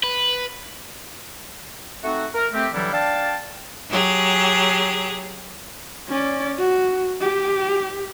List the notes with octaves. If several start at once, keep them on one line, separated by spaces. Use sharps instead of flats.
B4
A3 C4 D#4 F#4
A#4
A3 C4 G4
D3 E3 F#3 G3 D4 E4
D4 F5 G5 A5
F#3 G4 G#4
C#4 D5
F#4
G4